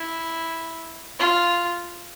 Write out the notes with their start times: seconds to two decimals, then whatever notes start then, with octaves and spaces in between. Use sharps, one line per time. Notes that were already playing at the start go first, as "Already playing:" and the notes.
Already playing: E4
1.19 F4